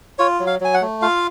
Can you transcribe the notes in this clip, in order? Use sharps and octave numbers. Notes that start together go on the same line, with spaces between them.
F4 C#5
F#3
F5
F#3 G#5
F#5
A3
F4 F5